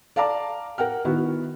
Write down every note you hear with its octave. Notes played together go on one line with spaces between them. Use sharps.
D5 F5 A5 A#5 D6
A#4 F#5 G5 F6
D#3 B3 E4 F#4